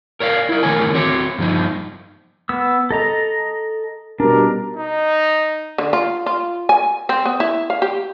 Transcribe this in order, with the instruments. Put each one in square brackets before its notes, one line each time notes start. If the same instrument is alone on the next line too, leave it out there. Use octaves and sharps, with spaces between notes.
[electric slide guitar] A#4 C#5 D5 F5
E4 A#4
D#3 E3 A3 A#4 C#5 G#5
C4 F#4 C#5
G2 F3 D#4
[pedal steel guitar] B3 E6
A4 D#5 A#5
[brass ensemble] B2 G3 A#4 [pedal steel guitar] D4
[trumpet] D#4
[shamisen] D3
F4
F4
G#5
C4
B3
E4
F5
G4